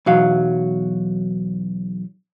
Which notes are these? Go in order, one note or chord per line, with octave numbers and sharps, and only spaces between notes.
B1 E2 F#3 F5